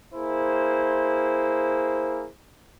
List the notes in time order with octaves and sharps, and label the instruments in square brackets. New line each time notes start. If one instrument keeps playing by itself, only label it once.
[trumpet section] A#3 E4 G#4 C5